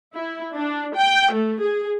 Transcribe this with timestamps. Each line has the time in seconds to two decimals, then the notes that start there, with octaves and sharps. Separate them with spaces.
0.14 E4
0.54 D4
0.95 G5
1.32 A3
1.62 G#4